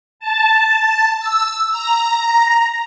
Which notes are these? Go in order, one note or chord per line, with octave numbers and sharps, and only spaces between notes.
A5
E6
A#5